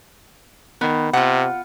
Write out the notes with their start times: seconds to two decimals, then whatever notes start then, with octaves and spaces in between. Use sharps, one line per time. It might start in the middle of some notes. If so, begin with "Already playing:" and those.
0.81 D#3 B3
1.13 C3 F4 F#5